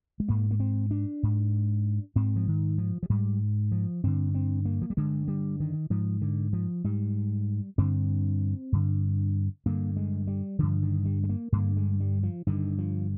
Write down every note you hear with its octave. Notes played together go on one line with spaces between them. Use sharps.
G#3
G#2 A#3
A#3
C4
D4
G#2
G#2 C4
F3
D#3
F3
F3
G#2 G3
F3
G2 D3 C4
C4
A#3
F3
G3
G2 D3 G#3
G3
D#3
G#2 F3
D3
F3
G#2 G3
G2 D3 C4
G2 D3
G2 D3 A#3
G#3
G3
G2 D3 F3
D#3
G3
G#3
A#3
G2 D3 A#3
G#3
G3
F3
G2 D3 D#3
F3